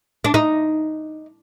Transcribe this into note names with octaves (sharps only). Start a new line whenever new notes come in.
D4
D#4